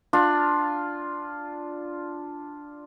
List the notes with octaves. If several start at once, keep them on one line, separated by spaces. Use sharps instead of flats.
D4 F4